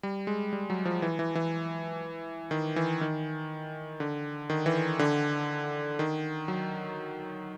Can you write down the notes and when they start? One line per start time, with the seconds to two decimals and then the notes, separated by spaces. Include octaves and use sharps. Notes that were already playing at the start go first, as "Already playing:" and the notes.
0.03 G3
0.27 G#3
0.53 G3
0.70 F#3
0.85 F3
1.02 E3
1.19 E3
1.35 E3
2.51 D#3
2.76 E3
3.01 D#3
4.00 D3
4.50 D#3
4.66 E3
4.99 D3
5.99 D#3
6.48 F#3